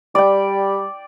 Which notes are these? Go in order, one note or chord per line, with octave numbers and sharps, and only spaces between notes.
G3 D5 G5